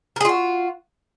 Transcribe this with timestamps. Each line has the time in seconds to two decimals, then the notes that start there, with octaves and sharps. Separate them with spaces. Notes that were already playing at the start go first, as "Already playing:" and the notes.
0.16 A#4
0.21 G#4
0.25 F4
0.29 F#4